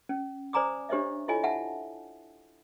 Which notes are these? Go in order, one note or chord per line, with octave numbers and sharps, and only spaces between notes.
C#4
C5 D5 G#5 A#5 D6 D#6
D4 G4 C5 C#5 D#5 E5
E4 F4 A4 C#5 D#5 G#5
E5 F#5 A5